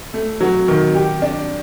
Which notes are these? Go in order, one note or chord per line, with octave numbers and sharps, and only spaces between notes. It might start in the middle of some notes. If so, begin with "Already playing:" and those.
A3
F#3
D#3
G4
D4